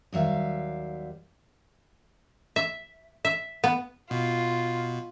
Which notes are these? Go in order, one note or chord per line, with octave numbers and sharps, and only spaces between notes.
D#2 F#3 G3 E5 F5
E5
E5
B3
B2 F4